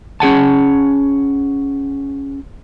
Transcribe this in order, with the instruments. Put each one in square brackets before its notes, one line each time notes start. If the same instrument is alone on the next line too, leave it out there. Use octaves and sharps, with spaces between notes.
[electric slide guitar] C#4 G#4 F#5 A5